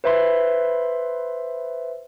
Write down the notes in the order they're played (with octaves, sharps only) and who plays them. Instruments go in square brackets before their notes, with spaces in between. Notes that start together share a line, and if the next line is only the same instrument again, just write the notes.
[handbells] B4 C5 E5 B5 C6